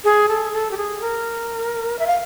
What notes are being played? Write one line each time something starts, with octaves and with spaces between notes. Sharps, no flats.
G#4
A4
A4
G4
G#4
A#4
E5
F5